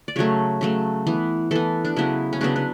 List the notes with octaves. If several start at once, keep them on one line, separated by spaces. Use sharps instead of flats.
D5
C#3 F#3 A3 C#5
C#3 F#3 A3
E3 B3
E3 B3 A4
D4
C#3 F#3 B3 E4
C#4
C#3 F#3 B3 D4
B3